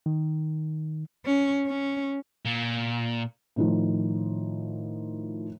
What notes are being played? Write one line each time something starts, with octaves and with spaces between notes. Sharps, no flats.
D#3
C#4
C#4
A#2
A2 D#3 F3